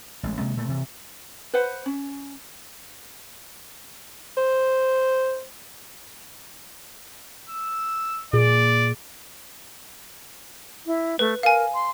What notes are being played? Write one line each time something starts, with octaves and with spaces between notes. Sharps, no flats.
A1 G#3
C3 G#3 A#3
A#2 A3
C3 E3
B4 C5 F#5
C#4
C5
E6
A#2 G#4 D5
E4
A3 B4
A#4 F5 G#5
C6